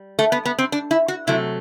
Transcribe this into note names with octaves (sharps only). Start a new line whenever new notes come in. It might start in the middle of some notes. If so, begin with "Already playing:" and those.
Already playing: G3
A3
B3
B3
C4
D4
E4
F#4
C3 F#3 A3 E4